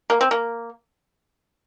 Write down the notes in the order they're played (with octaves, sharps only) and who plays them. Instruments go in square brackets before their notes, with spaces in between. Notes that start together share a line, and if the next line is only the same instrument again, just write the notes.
[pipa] A#3
C4
A#3